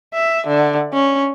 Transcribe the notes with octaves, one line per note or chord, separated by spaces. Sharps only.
E5
D3
C#4